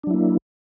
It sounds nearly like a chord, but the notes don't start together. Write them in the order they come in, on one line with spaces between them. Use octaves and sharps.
D4 F#3 E4 A#3